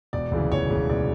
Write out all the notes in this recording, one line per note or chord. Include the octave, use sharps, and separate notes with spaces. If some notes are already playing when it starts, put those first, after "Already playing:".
E1 D5
D2 C#3 E3
E1 C#5
D2 C#3 E3
E1 D5